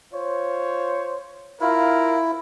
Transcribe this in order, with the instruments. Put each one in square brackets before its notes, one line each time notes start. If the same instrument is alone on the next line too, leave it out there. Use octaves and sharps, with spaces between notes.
[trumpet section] F4 C5 C#5
[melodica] E4 [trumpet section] F4 A#4 F5